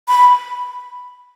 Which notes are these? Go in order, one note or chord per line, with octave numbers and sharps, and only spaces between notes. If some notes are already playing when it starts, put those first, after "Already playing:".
B5